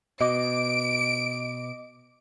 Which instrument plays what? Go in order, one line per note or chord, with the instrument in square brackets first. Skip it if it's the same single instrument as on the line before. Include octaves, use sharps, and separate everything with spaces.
[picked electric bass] B2 [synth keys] D#5 D6 [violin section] D7